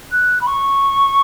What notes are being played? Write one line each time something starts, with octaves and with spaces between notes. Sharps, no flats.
F#6
B5
C#6